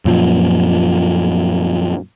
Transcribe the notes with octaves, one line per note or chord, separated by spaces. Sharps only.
F#2 A#2 F3